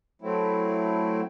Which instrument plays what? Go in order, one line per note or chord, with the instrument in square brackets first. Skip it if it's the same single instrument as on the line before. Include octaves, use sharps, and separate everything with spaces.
[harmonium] F#3 A3 C4 E4